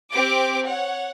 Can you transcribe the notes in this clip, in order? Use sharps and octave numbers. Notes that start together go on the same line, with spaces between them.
C4 G4 D6
C#5 F#5